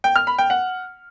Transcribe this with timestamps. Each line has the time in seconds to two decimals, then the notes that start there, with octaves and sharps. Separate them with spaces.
0.04 G5
0.16 F6
0.27 B5
0.39 G5
0.50 F#5